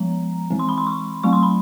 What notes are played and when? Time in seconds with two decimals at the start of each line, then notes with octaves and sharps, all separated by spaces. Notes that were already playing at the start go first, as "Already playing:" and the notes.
Already playing: F3 G#3 B3 A#5
0.50 E3 G#3 C4
0.59 C6
0.69 B5
0.78 C6
0.87 C#6
1.23 F#3 A3 C4 C#6
1.33 C6
1.43 B5